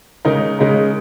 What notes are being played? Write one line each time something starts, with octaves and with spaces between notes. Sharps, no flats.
C#3 G#3 D#4 A#4
C#3 G#3 D#4 A#4